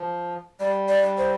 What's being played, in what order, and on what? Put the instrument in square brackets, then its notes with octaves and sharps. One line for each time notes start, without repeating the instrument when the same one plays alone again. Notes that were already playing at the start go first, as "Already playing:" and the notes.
Already playing: [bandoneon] F3
[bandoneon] G3 [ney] D5
[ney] D5
C5